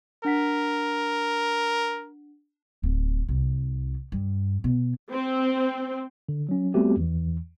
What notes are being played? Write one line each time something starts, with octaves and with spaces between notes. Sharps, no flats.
D4 A#4 F#5 B6
D1
C2
G2
B2
C4
D3
F#3 C#4
G3 A3 B3 C4 F#4 G4
E2 E3